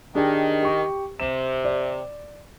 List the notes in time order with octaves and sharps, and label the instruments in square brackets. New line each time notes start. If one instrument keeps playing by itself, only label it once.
[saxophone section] D#3 [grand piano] D4 G4 G#4
[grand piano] G4 C#6
[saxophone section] C3 [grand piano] E7
[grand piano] D5